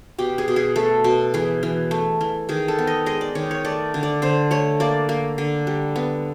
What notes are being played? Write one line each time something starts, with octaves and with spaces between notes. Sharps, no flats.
B2 G4
G#4
B2
G#4
A3 A4
B2
E3 G#4
E3
A3
E3
D#3 G#4
A4
B3
D#5
G#3 D#5
D5
D#3 C#5
C#5
A3 D5
D3
D5
D3 C5
A3 C#5
A#3 D5
A#3
D3
G3
B3